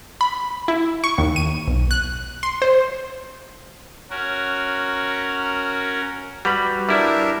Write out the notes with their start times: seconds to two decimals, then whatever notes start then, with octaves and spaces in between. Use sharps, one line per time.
0.21 B5
0.68 E4
1.04 C#6
1.18 D#2
1.36 D#7
1.68 B1
1.91 F#6
2.43 C6
2.62 C5
4.10 C#4 F#4 A#4
6.45 G3 F#4 B4 B5
6.89 G3 D4 E4 A#4 E5